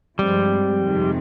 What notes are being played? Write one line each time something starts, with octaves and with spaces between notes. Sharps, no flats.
G2 F3 G3 G#3 C4
F2 C3 D#3 G#3 C4